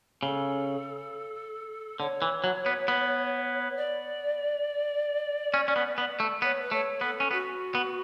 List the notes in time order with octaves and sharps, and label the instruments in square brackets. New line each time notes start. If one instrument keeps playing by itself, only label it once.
[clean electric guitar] C#3 [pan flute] A4
[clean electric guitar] D3 [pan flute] C#5
[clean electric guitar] E3
F#3
B3
B3
[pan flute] D5
[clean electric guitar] C#4
C#4
B3
B3
A3
[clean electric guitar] B3 [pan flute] C#5
[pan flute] B4
[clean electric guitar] A3 [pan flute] C#5
[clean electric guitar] B3 [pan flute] A4
[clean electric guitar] C#4
[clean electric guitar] B3 [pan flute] F#4
[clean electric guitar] B3